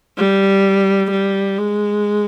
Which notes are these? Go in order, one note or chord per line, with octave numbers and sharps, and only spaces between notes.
G3
G3
G#3